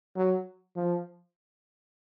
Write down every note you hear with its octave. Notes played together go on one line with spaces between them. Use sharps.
F#3
F3